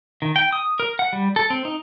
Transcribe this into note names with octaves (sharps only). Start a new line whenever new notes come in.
D#3
G5
D#6
A#4
F#5
G3
A4
C4
D#4